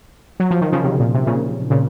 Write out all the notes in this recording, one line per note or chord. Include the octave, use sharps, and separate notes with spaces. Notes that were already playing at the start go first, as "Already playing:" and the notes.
F#3
F3
D#3
C#3 F3
C3 D#3
A#2
C3
A#2 C#3
A#2 C#3